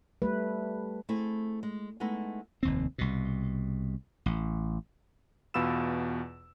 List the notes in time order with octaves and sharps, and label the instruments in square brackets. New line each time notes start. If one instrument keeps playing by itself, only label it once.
[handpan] G3 A3 B4
[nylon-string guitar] A3 C4 E4 G#4
G#3
G#3 A3 B3 D#4 E4
[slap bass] F1 D#2 C4
C2 B2
A1
[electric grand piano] E2 B2 F4 B5 E6 E7